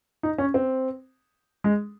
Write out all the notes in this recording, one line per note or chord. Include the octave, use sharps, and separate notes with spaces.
D#4
C#4
C4
G#3